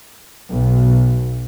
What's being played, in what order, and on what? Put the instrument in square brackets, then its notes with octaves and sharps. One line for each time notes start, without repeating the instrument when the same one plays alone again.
[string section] B1